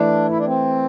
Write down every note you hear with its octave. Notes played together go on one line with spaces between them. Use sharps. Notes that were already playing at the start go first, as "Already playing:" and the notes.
Already playing: E3 A3 D4 E4
E4
D4
C4